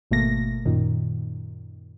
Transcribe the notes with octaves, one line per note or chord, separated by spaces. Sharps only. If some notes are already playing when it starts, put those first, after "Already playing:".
G#1 B2 A3 A#3 A#6
F#2 A#2 D#3